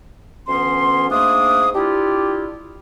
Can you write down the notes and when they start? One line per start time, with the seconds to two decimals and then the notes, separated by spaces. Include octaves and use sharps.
0.48 D2 E3 B3 C#4 C6
1.10 G#2 A3 A#3 D4 D#6
1.75 D4 E4 F4 G4